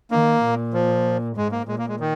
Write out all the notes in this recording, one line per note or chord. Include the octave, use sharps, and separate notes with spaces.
D#3 A#3
A#2
F3
G#2 G#3
A#3
A#2 G#3
A#3
G#3
D#3